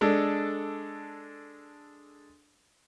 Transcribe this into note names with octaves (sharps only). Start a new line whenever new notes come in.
G#3 D4 A4